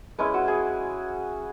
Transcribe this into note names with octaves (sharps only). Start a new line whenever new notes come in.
G#3 C#4 E4 B4
F#4
G#4